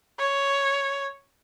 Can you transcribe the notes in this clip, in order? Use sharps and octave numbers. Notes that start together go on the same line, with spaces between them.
C#5